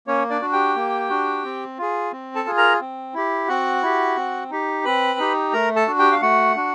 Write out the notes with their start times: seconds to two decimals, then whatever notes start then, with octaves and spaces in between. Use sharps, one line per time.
0.07 A#3 C#4 C#5
0.30 D4 D5
0.41 D4 F#4
0.52 G4 G5
0.75 A#3
1.10 D4 F#4
1.44 C4
1.78 F4 G#4
2.12 C4
2.35 A4 A5
2.46 F4 G#4
2.57 A#4 A#5
2.80 C4
3.14 E4 G4
3.48 C4 F#4 F#5
3.83 E4 G4
4.17 C4
4.50 D#4 G4
4.85 C4 B4 B5
5.19 D#4 G4
5.53 A3 A#4 A#5
5.76 A4 A5
5.87 D4 F#4
5.99 G4 G5
6.12 F5
6.22 A3 F#4 F#5
6.56 D4 F#4